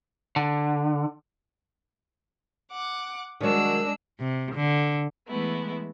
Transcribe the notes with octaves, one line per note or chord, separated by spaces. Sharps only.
D3
F#5 D6
D#3 F#3 G#3 D4 E6
C3
D3
E3 G#3 A3 B3 E4